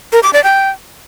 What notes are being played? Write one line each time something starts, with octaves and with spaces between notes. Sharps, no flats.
A#4
D6
D5
G5